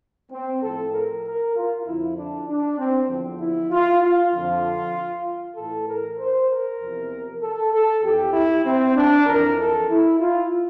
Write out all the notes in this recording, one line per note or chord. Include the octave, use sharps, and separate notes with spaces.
C4
A2 F3 A4
A#4
A#4
F4
F2 D3 F3 E4
D4
D4
C4
E2 D3 F3
E4
F4
F4
F2 D3 F3
A2 E3 A4
A#4
C5
A#4
E2 C3 F3
A4
A4
F2 E3 G4
E4
C4
D4
F2 E3 A#4
A4
E4
F4